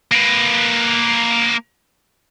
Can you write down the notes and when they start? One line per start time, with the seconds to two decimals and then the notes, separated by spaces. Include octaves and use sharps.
0.12 A#3 B4